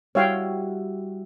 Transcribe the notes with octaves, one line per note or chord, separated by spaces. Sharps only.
G3 E4 F#4 C#5 F5 G5